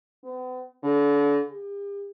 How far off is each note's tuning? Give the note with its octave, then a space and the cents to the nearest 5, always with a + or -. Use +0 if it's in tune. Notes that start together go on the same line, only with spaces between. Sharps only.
B3 +45
D3 -35
G4 +40